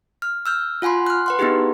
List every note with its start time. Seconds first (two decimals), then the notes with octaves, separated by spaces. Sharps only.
0.22 F6
0.46 E6 F6 G6
0.82 F4 F#5 G#5 B5 C6
1.07 F6 F#6
1.26 B4 F#5 C6
1.39 B3 D#4 E4 G4 G#4